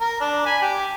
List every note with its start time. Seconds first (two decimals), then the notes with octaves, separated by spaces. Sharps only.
0.01 A#4
0.20 D4
0.46 G#5 B5
0.62 G4